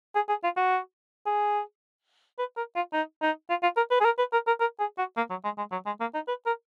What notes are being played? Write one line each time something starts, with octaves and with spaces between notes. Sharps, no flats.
G#4
G#4
F4
F#4
G#4
B4
A#4
F4
D#4
D#4
F4
F4
A#4
B4
G#4
A#4
B4
A#4
A#4
A#4
G#4
F#4
A#3
F#3
G#3
G#3
F#3
G#3
A#3
D#4
B4
A#4